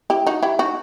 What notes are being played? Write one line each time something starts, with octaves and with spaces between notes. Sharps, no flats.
E4 G4
D#4 F#4
E4 G4
D#4 F#4